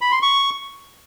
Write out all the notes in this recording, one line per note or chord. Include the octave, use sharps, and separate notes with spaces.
B5
C6
C#6